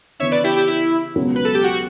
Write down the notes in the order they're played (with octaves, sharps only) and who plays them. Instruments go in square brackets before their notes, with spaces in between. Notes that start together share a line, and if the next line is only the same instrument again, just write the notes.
[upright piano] C#3 E3 B3 D4 [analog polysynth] C#5 E5
[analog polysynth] B4 D5
E4 G4
E4 G4
E4
[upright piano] C#2 B2 F#3
[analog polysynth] B4
A4
G4
F#4